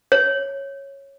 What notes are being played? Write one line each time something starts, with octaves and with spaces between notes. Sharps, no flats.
C#5